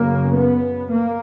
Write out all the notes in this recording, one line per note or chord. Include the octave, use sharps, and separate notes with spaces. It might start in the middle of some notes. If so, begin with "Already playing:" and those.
Already playing: F#2 C#3 A#3
B3
A#3